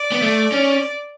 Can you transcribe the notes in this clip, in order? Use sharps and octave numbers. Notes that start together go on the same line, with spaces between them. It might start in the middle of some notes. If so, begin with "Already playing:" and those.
Already playing: D5
B3
A3
C#4